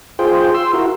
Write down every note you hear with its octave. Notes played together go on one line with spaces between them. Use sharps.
F4 G#4 C5 G5
C6 E6
E4 F#4 A#4